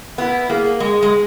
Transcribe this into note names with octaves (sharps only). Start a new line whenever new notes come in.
B3 E4
A#3 G#4
G#3 G#4
G#3